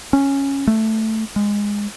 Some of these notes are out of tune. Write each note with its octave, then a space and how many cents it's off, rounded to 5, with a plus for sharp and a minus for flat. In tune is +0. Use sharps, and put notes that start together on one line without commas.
C#4 -5
A3 +5
G#3 -15